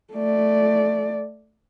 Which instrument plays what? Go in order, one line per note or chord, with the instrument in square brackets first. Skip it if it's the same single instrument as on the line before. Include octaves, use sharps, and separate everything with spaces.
[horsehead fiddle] A3 D5